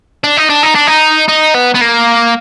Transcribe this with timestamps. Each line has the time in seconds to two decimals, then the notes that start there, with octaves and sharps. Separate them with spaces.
0.24 D4
0.37 D#4
0.50 D4
0.63 D#4
0.75 D4
0.87 D#4
1.28 D#4
1.54 B3
1.74 B3
1.81 A#3